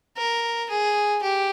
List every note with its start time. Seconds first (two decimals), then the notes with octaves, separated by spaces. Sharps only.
0.17 A#4
0.70 G#4
1.22 G4